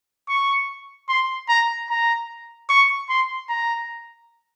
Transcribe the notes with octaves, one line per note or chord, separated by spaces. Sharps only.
C#6
C6
A#5
A#5
C#6
C6
A#5